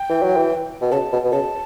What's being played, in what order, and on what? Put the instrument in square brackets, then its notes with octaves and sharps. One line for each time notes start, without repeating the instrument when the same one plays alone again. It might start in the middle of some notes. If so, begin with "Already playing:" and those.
Already playing: [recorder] G5
[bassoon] E3
F#3
E3
B2
[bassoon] C#3 [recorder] A5
[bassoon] B2
B2
[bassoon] C#3 [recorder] A5